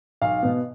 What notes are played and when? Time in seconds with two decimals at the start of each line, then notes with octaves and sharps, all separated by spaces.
0.22 B1 F5
0.42 B2 B3